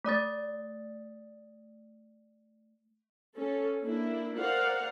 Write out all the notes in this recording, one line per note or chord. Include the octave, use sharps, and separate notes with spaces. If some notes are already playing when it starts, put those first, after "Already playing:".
A3 D5 D#6 A6
C#4 A4
A#3 D4 E4
A#4 C5 D5 F5 F#5